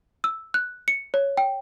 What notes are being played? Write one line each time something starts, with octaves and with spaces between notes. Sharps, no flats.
E6
F#6
C#7
C#5
G5